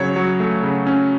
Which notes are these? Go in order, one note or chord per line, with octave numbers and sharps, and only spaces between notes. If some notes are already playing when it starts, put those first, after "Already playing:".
Already playing: C#3 F#3 C#5
F#3
A3
C#3
C#4